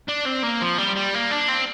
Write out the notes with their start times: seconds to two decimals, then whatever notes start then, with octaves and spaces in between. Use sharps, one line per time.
0.09 D4
0.26 C4
0.43 A#3
0.62 F3
0.78 G3
0.96 G3
1.14 A#3
1.31 D4
1.48 C4